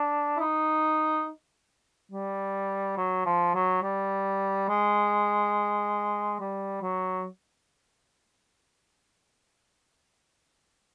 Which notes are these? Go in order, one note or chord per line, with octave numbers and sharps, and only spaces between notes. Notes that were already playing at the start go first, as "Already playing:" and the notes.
Already playing: D4
E4
D#4
G3
F#3
F3
F#3
G3
G#3
G3
F#3